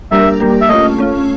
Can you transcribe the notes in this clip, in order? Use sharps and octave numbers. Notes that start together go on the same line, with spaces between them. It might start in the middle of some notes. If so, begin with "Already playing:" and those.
G3 A#3 D4 G4 A#4 E5
G3 A#3 D4 G4 A#4
E5
A3 C#4 F4 D#5
A3 C#4 F4